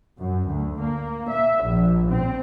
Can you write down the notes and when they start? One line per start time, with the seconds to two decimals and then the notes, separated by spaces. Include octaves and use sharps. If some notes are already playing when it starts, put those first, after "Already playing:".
0.18 F#2
0.47 D2
0.83 A#3
1.31 E5
1.62 A#1
2.10 C4